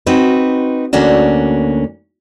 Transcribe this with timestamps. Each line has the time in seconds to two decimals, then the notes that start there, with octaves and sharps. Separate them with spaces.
0.06 C4 D#4 F#4 B4
0.93 D2 A#3 C#4 D4 F#4